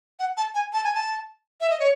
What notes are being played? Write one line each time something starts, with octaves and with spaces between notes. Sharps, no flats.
F#5
A5
G#5
A5
G#5
A5
E5
D#5
C#5